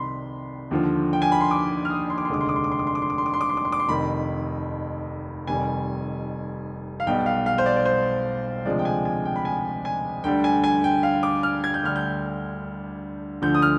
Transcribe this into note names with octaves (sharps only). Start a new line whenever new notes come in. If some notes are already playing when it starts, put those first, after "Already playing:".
Already playing: C2 C3 D#3 B5 C6
D#2 D3 F3
G5
G#5
B5
C6
D6
F6
D#6
C6
D6
C6
F1 D#2 D3 G#3 D6
C6
D6
C6
D6
C6
D6
C6
D6
C6
D6
C6
D6
C6
D6
C6
D6
C6
D6
C6
F1 F2 D#3 B5
F1 F2 D#3 G3 G#5
F5
B1 B2 G3 G5
F5
F5
C5
D5
D5
C5
D2 C3 F3 G#3 D5
G5
G#5
G#5
G5
B5
G#5
G#5
D2 D3 G3 G5
G#5
G#5
G5
F5
D6
F6
G#6
G6
D2 D3 G3 F6
G6
D2 D3 F3 G6
D#6
F6